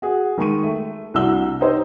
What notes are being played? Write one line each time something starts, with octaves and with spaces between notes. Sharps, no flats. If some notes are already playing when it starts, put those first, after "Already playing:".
F#4 G#4
D#3 G#3 C#6 D#7
A3
C2 D4 F#4 E6 G7
D#4 G4 C5 C#5 D#5